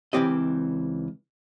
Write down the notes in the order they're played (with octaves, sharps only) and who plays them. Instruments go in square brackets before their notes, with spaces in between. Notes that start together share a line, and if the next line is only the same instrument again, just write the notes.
[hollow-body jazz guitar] C#2 A#2 E3 C4 G4 D#5